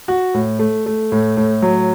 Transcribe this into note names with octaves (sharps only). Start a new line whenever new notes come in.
F#4
A2
A3
A3
A2
A2
F#3